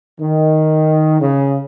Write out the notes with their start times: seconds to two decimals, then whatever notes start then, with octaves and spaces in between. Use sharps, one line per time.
0.20 D#3
1.21 C#3